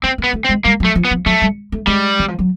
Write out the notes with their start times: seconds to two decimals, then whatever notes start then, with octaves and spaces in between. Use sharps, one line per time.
0.03 A#3 C4
0.18 A#3
0.24 B3
0.33 A3
0.45 C4
0.49 G#3
0.64 G3 A#3
0.80 F#3
0.85 A3
0.95 F3
1.05 B3
1.11 F3
1.26 F#3 A3
1.42 G3
1.72 A3
1.87 G3 G#3
2.19 E3
2.28 F3
2.39 F#3